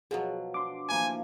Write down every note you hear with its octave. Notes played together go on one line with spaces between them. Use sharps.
B2 F3 F#3 G#4
D4 C6 D6
F3 A#3 E4 G#5